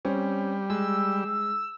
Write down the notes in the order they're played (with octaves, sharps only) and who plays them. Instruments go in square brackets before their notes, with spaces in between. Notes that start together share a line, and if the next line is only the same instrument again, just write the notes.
[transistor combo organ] G3 [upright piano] C4 C#4
[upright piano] G#3 [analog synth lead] E6